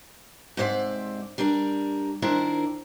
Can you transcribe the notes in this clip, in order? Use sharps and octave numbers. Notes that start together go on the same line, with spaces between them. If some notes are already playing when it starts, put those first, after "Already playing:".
G#2 C3 C5 D5 E5
G3 D4 A#4 D5
D#3 D4 E4 A#4 C5